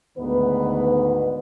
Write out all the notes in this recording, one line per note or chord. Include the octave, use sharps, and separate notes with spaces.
D2 G#2 D#3 B3 B4